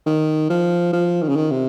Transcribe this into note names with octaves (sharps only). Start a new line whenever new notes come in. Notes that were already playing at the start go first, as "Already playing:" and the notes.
D#3
F3
F3
D#3
C#3
D#3
C3